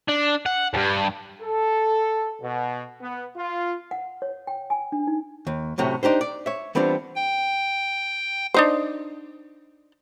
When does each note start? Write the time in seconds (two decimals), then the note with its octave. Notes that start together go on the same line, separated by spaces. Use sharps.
0.09 D4
0.46 F#5
0.74 E2 G2
1.41 A4
2.41 B2
3.00 B3
3.36 F4
3.91 F#5
4.22 C#5
4.47 G5
4.70 G#5
4.92 D4
5.07 D#4
5.47 D#2
5.78 F#2 A2 C3 F#3
6.03 D4 D#4 G4 C5
6.21 D5
6.46 C#5 E5
6.75 E3 G3 B3 C4 D4 F4
7.15 G5
8.54 D4 D#4 C5